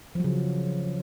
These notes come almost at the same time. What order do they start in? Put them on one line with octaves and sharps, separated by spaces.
F3 F#3 C#3